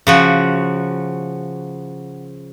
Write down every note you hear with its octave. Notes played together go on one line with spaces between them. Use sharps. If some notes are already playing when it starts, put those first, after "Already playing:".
C#3 F3 F#4